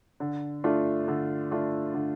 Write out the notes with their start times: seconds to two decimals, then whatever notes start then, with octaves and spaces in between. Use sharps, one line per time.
0.20 D3
0.64 A3 D4 F4
1.08 D3
1.51 A3 D4 F4
1.94 D3